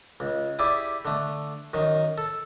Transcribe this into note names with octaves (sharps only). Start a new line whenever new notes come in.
C#2
E4 G4 G#4 D5 E5
D3 A3
F#2 D#3
A4